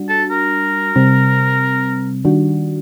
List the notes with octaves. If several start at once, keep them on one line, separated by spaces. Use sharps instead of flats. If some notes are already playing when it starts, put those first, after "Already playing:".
Already playing: G3 D4 F#4
A4
A#4
C3 G3 C4
D#3 G3 D4 F#4